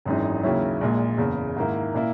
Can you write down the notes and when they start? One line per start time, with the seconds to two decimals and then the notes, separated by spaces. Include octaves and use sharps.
0.05 G#1 F#2 E3 G#3 D#4
0.43 D#2 C#3 F#3 C#4 E4
0.81 A#1 A#2 G#3
1.18 F#1 E2 C#3
1.56 G#2 D#3 A#3 E4
1.94 A#2 A#3 E4